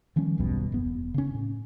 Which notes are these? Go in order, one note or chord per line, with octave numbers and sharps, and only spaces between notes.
D#3 F3 G3 C#4
D#1 B1 G2 B2
E1 F#2 B3
C#3 C#4
A2